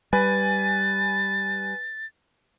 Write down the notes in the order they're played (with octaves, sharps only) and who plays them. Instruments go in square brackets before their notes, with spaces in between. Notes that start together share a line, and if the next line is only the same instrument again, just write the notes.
[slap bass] G3 [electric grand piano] B4 G#5 [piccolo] A6